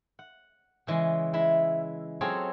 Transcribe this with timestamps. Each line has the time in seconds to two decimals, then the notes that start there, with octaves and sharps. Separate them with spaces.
0.19 F#5
0.87 C#3 E3 G#3
1.33 G#3 E4 E5
2.21 F#3 C4 F4 G#4 A4 C#5